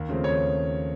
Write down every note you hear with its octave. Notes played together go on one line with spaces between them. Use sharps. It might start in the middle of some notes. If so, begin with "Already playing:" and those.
Already playing: D#2
C#3 F3 A3 C4
D#2 C#5